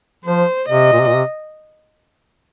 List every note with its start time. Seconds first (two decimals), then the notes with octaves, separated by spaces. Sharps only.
0.25 F3 C5
0.69 C3 D#5
0.92 A#2
1.00 C3
1.08 A#2
1.15 C3